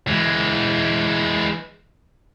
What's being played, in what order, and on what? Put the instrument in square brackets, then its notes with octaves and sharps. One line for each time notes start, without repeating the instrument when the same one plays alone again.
[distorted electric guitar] E3 G#3